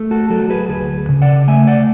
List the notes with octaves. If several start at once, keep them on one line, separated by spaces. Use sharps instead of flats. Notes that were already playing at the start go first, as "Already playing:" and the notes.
Already playing: A3
F#4 A4
F#3 F#4 A4
G#4 B4
D2 G#4 B4
C#3
D5 F#5
A3 E5 G#5
D5 F#5